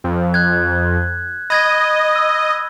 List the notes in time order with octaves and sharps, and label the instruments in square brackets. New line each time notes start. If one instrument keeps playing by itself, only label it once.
[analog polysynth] F2
[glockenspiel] F#6 G#6
[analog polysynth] D#5 [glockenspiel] B5 G#6 A#6
[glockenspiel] E6